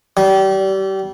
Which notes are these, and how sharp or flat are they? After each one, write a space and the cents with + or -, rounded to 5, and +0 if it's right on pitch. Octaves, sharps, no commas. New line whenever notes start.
G3 -30